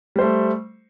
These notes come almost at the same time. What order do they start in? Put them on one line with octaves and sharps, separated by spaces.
G3 C5 A3